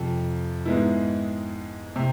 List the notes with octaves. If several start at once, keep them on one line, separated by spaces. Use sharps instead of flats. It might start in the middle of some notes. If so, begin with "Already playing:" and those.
Already playing: F2 C3 F3
G#2 G#3 B3 E4
C3